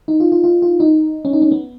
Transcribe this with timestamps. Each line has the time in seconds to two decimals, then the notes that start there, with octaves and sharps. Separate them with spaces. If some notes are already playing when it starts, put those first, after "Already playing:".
0.08 D#4
0.20 F4
0.32 F4
0.44 F4
0.62 F4
0.80 D#4
1.25 C#4
1.33 D#4
1.42 C#4
1.51 B3